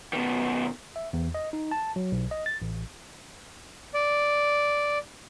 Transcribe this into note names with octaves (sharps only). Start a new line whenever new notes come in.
B2 D#3
E5
E2
D#5
D#4
A5
F#3
B1
D#5
A6
A1
D5